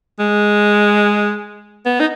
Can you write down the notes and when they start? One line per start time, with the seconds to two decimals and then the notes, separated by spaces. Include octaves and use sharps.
0.19 G#3
1.86 B3
2.00 D#4